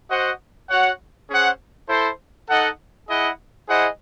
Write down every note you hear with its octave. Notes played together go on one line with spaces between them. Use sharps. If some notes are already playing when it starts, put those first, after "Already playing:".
F#4 C5 D#5 F#5
F#4 C#5 F#5
C#4 G#4 C5 F#5
E4 A4 C5
D#4 A4 D#5 F#5
E4 G#4 D#5 F#5
E4 G#4 C5 D#5 F#5